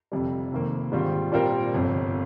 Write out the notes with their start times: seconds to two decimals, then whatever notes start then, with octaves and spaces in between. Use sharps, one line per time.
0.12 F1 F2 C3 G3
0.52 F1 F2 D#3 A#3
0.92 G#2 D#3 G3 C4 F4
1.32 A#2 G3 C4 F4 A#4
1.72 G1 F2 C3